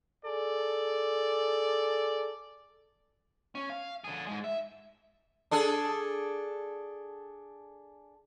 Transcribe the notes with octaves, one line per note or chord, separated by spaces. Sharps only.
G#4 A4 D5
C#4
F5
D3 G#4
G#2 G#3
E5
D4 G#4 A4